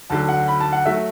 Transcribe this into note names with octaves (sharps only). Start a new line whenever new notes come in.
D2 D3 F#3 A5
F#5
B5
A5
F#5
F#3 A3 E5